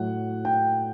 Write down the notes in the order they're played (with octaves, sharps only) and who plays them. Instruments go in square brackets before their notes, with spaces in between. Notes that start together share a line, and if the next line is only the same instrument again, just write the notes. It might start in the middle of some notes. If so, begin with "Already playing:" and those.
Already playing: [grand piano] A2 F#3 F#5
G5